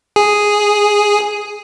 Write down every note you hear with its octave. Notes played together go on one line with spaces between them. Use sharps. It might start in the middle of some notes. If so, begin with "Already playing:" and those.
G#4